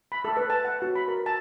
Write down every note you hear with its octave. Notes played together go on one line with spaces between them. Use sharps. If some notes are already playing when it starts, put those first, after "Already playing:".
B5
A4
B4
A5
F#5
F#4
B5
A#4
A5